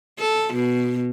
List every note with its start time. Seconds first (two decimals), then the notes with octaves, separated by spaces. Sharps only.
0.20 A4
0.54 B2